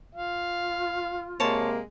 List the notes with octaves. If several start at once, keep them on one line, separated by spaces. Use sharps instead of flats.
F4 F5
C3 G#3 A#3 C#5 A5 C6